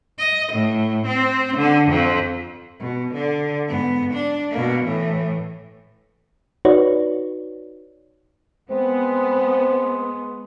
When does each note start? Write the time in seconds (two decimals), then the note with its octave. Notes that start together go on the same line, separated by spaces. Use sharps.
0.19 D#5
0.52 A2
1.06 C4
1.57 D3
1.89 F2
2.80 B2
3.13 D3
3.68 G#2 B3
4.13 D4
4.51 B2 A#3
4.84 A2 E3
6.65 D#4 F#4 B4 C#5 D5
8.70 G#3 B3 C4